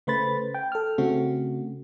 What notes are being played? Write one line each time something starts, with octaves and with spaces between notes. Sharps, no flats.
C#3 A3 B4 C5 B5 A6
G5
A4 F6
C#3 A3 C4 F#4